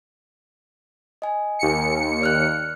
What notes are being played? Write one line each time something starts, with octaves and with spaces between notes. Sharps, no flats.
D#5 G#5
D#2 C#7
D5 F6 F#6